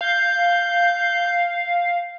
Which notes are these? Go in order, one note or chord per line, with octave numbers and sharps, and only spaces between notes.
F5 G6